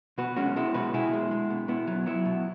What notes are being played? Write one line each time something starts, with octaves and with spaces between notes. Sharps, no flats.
B2 F#4 B4
G#3 C#4 F#4
G#3 B3 E4
B2 F#4 B4
B2 E4 G#4
G#3
G#3
B2
B2 B3 E4
F#3
F#3 B3 E4
B2